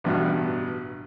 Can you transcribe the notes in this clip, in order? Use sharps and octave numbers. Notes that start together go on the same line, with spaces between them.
A1 G2 B2